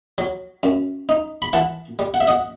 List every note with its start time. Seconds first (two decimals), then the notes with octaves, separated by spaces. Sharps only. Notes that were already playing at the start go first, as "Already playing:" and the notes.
0.18 F#3
0.63 F#2
1.09 D#4
1.42 B5
1.53 E3 F#5 A5
1.99 G3
2.14 F#5
2.20 E5
2.27 D#5 F#5